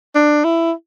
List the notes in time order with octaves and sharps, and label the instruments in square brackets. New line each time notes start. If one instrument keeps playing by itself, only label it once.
[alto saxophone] D4
E4